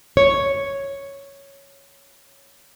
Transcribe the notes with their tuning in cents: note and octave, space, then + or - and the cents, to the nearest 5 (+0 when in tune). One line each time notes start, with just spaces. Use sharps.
C#5 +0